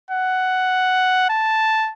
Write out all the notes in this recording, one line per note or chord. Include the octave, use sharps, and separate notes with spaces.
F#5
A5